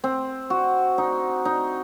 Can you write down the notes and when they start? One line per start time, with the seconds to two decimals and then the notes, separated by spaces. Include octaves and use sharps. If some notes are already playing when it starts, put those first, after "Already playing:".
0.04 C4
0.50 F#4
0.98 D#4
1.45 D#4